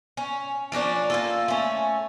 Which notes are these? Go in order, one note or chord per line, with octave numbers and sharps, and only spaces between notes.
C#4
F3 A#3 C#4 D4
A#3 F4 A4
A3 C#4